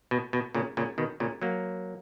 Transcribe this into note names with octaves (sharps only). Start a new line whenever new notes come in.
B2
B2
A#2 C#3
A#2 C#3
B2 D#3
A#2 C#3
F#3 A#3